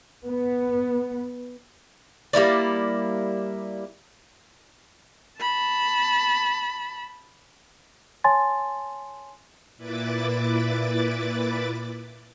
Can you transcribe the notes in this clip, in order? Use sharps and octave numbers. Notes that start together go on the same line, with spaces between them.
B3
G3 A#3 E4 D5
A5 B5
C#5 G#5 A5 C6 A6
A#2 E4 B4 D6 A6